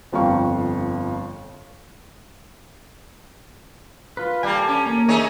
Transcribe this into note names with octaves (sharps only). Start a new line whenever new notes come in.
G1 F2 F5 G5 C#6
F4 B4
G3 A#3 A4 G#5
C#4
A#3 C#4
D#4 G#4 C#5 D#5 E5